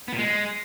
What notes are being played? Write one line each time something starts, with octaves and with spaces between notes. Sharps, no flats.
B3
A#2
G#3